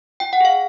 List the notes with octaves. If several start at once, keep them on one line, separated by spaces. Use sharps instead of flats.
F4 G5
F#5
G#4 F5